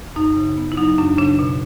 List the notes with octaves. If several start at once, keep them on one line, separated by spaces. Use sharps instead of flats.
F#2 D#4
C#3
B3
E4
F#3 D#4
F#2 D4
C#3 D4
B2